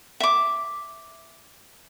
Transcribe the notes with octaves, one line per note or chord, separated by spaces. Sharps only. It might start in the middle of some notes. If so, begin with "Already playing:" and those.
E5 D6